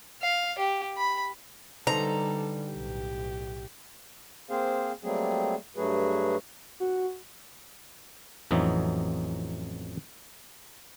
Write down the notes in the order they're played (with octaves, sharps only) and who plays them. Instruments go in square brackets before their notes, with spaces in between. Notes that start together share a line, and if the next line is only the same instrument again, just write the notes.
[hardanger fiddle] F5
G4
B5
[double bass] D3 G3 [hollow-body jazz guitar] D#4 B4 C5 [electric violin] A4 [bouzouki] A#5
[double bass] B1 A2 [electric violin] G4
[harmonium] A#3 C4 G#4 C5 F5
F#3 G3 A3 A#3 C4 G#4
G2 F#3 A3 F#4 G#4 B4
[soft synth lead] F#4
[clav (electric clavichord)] A1 F2 E3 F#3 D#4